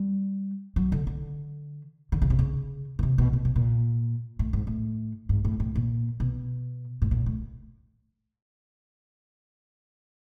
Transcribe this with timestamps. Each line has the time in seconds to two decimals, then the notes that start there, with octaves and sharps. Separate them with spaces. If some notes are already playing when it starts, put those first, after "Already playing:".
Already playing: G3
0.76 F#3
0.92 D3
1.07 D3
2.12 D3
2.22 C#3
2.30 C3
2.39 C#3
2.99 B2
3.03 C3
3.18 B2
3.33 A#2
3.45 B2
3.56 A#2
4.39 A2
4.53 G#2
4.67 A2
5.29 G#2
5.45 A2
5.60 A2
5.75 A#2
6.20 B2
7.02 A2
7.11 A#2
7.26 A2